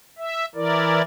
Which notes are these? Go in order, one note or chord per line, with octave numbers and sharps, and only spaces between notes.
E5
E3 E4 A#4 D5